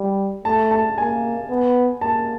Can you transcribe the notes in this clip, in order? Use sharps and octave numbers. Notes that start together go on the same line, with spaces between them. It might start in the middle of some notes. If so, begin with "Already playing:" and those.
Already playing: G3
A3 A5
A5
A#3 G#5
B3
A#3 A5